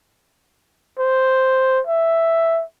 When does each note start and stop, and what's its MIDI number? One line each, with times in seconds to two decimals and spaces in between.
0.99 1.81 72
1.87 2.63 76